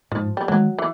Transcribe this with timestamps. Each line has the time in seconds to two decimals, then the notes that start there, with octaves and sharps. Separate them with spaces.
0.11 G#2 F3
0.37 G3
0.48 D#3 F#3 G#3
0.79 E3